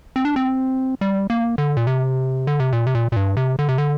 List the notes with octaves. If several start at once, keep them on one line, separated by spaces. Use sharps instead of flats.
C4
D4
C4
G3
A#3
D3
A#2
C3
D3
C3
A#2
C3
A#2
A#2
G2
C3
D3
C3
D3